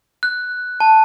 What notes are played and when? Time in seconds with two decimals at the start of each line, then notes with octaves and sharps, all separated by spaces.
0.23 F#6
0.80 A5